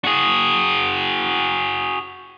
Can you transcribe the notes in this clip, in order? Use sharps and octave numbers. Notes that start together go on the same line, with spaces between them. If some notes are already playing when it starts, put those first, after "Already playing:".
F#4 G#4